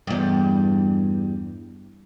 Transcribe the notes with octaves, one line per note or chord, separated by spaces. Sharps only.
E2 G2